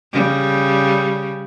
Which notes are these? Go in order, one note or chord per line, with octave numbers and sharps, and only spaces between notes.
C#3 G3